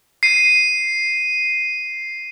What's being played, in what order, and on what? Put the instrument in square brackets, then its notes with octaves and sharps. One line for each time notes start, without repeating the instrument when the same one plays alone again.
[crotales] C7 D#7